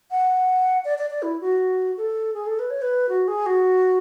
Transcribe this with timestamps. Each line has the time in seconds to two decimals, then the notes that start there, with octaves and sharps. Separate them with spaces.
0.11 F#5
0.85 D5
0.98 D5
1.10 D5
1.22 E4
1.41 F#4
1.97 A4
2.34 G#4
2.46 A4
2.59 B4
2.70 C#5
2.82 B4
3.09 F#4
3.28 G#4
3.46 F#4